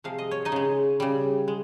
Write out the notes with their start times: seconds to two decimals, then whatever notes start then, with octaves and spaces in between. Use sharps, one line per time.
0.04 C3 F3 G#3 F5
0.18 D#5
0.31 C#5
0.45 D#4 D#5
0.52 C#3 G#3
1.00 C#3 G3
1.48 G#3